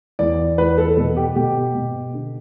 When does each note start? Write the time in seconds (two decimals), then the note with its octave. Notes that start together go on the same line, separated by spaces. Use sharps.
0.19 E2 D5
0.58 E2 B4
0.78 A4
0.97 B2 A4
1.16 G4
1.36 B2 G4
1.75 B2
2.14 D3